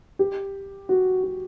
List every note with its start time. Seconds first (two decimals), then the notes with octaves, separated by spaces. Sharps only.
0.19 G4
0.89 F#4
1.23 F#4